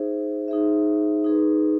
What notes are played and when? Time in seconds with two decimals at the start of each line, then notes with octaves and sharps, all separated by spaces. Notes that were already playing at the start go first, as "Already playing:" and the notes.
Already playing: D#4 G#4 C5 E5
0.48 D#4 G#4 C5 E5
1.24 D#4 G#4 B4